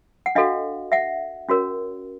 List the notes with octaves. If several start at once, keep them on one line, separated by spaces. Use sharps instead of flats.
F#5
D4 F#4 A4 D#5 F5
E5 F#5
C#4 F#4 A#4 C#5